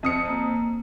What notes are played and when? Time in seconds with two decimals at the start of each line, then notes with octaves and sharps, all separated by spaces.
0.03 F2 D#6 C#7
0.28 A#3